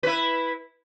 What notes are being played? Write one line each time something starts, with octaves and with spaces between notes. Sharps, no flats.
E4 B4